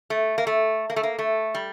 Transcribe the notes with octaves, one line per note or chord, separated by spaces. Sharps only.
A3
A#3
A3
A#3
A3
A#3
A3
G3